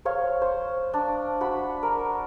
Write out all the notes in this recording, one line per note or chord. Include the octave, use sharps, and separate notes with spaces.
C5 C#5 F5
C5
D4
F#4 B5
A#4